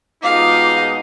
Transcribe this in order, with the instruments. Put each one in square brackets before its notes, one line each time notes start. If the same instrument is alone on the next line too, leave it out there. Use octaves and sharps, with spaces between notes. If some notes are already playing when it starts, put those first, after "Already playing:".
[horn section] B2 G#3 D#4 [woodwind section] F4 D6 [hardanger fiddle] F5